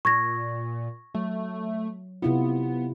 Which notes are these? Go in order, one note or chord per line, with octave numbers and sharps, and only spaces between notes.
A#2 C#6 G#6 A#6
F#3 A3
C3 B3 E4 F4